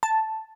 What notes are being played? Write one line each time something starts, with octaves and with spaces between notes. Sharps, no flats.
A5